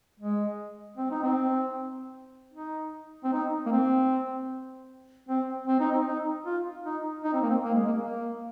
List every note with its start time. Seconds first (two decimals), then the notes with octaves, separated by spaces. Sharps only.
0.20 G#3
0.97 C4
1.11 D#4
1.23 C4
2.54 D#4
3.24 C4
3.32 D#4
3.66 A#3
3.72 C4
5.29 C4
5.67 C4
5.80 D#4
5.92 C4
6.07 D#4
6.46 F4
6.86 D#4
7.24 D#4
7.33 C4
7.42 A#3
7.50 C4
7.64 A#3
7.75 G#3
7.86 A#3
8.03 A#3